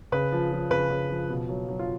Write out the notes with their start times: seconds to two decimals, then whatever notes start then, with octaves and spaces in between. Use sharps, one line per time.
0.12 C#3 B4
0.32 F3
0.52 F3
0.70 C#3 B4
0.90 C#3
1.10 F3
1.29 B2
1.49 F#3
1.68 F#3
1.79 F4